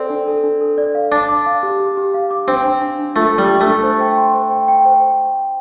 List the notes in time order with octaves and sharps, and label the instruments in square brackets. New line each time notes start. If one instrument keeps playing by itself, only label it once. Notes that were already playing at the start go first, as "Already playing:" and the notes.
Already playing: [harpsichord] C4 [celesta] A4 D5
[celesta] D4
A4
D4
A4
D5
F5
[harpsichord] D4 [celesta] D6
[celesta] D6
F5
G4
G4
G4
F5
D6
[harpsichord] C4 [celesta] D4
[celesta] D4
D4
D4
[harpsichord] A3 [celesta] F4
[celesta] A5
[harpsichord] G3
[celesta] F4
[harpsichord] A3
[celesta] D4
C5
G5
C6
C5
G5
G5
C5